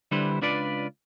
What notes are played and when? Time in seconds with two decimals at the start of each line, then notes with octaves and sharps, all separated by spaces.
0.11 D3 G3 D4 E4 B4 C5
0.42 C#2 D4 F4 B4 D5